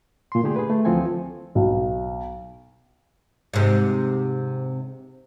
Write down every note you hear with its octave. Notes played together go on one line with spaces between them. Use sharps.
A#2 C6
D3 A3 G4 G#4
G#4 B4
A3
D2 E3 F3 C4 A4 G#5
B1
G#2 C3